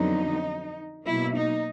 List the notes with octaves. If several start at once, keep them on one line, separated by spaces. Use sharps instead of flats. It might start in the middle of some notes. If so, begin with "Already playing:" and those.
Already playing: F2 D3 F#3 B3 D#4
B2 F#3 A#3 E4
D#4